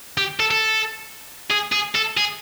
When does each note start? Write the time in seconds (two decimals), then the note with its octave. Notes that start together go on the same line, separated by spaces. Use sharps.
0.18 G4
0.40 A4
0.51 A4
1.51 G#4
1.72 G#4
1.95 A4
2.17 G#4